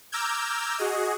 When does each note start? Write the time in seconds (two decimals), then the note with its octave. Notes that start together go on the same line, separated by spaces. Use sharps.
0.12 A#5 D6 E6 F6 G6 G#6
0.78 F#4 G#4 D#5